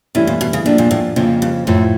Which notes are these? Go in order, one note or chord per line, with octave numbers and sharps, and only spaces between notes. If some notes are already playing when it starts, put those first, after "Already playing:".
G2 C3 E3 A3 C#4 E4
A#2
B2
C#3
A2 F3 A#3 D4
A#2
A2
F2 A2 C#3 F3 A#3
G2
F#2 A2 F3 A3